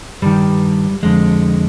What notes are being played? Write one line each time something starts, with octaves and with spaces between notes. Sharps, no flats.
G2 D#3 G3
F2 D3 G#3